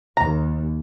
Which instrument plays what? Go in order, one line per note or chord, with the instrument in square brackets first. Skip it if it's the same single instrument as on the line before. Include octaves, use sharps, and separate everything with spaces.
[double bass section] D#2 [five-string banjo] A#5